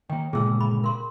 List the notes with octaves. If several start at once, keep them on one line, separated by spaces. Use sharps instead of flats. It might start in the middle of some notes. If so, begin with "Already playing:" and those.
D#3 A#3 G5
G1 A#2 C#3 G#3 G#4 E6
B5
A#4 C6